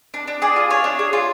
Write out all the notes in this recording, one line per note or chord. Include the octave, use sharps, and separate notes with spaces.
D4
D4
G#4 D5
F4
D4 C#5
D4
G#4
F4